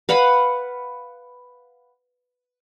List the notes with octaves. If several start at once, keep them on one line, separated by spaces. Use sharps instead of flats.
B4 F5 F#5 B5